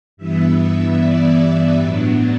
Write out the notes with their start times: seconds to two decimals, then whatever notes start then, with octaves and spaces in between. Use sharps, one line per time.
0.17 G2 E3 B3 E5
0.59 E5
0.99 D5
1.80 A2 F#3 B3 D4